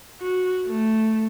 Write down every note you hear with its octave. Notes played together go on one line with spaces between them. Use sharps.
F#4
A3